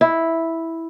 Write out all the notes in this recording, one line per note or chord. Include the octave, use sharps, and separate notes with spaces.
E4